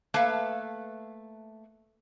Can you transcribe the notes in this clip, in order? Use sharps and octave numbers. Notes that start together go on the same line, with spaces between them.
A3 A#3 B4 E5 F5 A5